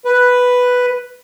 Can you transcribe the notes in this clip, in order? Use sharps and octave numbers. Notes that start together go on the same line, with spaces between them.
B4